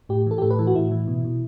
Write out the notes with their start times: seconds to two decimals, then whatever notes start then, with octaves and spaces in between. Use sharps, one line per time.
0.09 A2 G4
0.27 E3 A4
0.38 G4
0.42 A2 A4
0.50 B4
0.59 E3 A4
0.67 F#4
0.75 A2 E4
0.91 E3
1.07 B2
1.25 B2